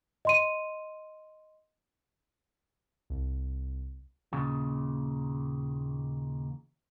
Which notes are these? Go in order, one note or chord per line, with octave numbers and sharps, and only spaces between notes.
D#5 C6 D#7
C2
D#2 A#2 C#3